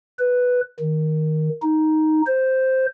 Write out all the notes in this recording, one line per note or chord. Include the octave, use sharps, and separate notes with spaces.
B4
D#3
D#4
C5